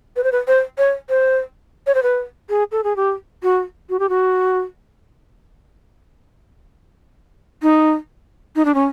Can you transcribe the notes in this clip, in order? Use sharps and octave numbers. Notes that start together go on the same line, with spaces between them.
B4
C5
B4
C5
C#5
C5
C#5
C5
B4
G#4
A4
G#4
G4
F#4
F#4
G4
F#4
D#4
D#4
D4
C#4